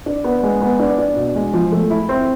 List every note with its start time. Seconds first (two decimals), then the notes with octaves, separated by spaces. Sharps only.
0.06 D4
0.24 B3
0.43 G#3
0.62 B3
0.79 D4
0.98 D4
1.16 B2
1.35 G#3
1.53 F3
1.72 A3
1.90 E4
2.09 C4